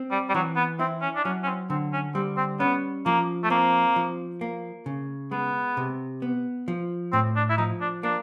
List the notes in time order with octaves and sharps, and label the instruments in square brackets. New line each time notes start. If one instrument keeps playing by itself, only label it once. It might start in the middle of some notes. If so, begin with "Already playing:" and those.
Already playing: [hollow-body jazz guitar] C4
[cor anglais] G3
G3
[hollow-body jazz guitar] E3 [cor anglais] F#3
[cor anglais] B3
[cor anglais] C4 [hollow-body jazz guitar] E4
[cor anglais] C#4
D4
[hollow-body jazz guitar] F#3 [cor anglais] C#4
[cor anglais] C#4
C4
[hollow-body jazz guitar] D3 [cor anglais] C4
[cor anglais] C#4
[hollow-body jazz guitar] G3 [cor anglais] C4
[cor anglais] C4
[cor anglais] B3 [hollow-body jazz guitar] C#4
[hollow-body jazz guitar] F3 [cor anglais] A#3
[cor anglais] A3
[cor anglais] A#3 [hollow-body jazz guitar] C4
[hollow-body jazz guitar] F3
A#3
C#3
[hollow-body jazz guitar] G#3 [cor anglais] B3
[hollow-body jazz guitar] C3
B3
F3
[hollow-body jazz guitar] A2 [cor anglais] C4
[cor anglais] D4
E4
[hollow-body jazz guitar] F3 [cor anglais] D#4
[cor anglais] D4
[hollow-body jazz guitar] A#3 [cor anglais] D4